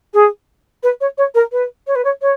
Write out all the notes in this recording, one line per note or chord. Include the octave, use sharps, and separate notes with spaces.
G#4
B4
C#5
C#5
A#4
B4
C#5
B4
C#5
C#5